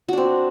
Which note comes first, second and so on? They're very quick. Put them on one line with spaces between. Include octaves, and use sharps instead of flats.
F#4 D4 C4